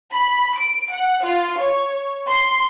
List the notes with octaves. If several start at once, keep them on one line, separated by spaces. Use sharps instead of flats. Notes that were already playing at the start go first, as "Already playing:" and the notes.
B5
D7
F#5
F4
C#5
C6